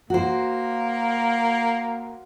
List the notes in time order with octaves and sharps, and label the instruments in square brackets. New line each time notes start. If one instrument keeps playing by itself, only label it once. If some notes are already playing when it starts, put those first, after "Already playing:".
[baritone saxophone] A#3 [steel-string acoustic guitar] F#4 C5